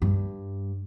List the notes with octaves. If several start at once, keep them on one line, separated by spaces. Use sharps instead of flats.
G2